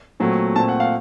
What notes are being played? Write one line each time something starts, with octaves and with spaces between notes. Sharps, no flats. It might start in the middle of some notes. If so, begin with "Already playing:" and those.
A#2 F#3 A3 C4
A#2 A3 C4 A5
F#5
F5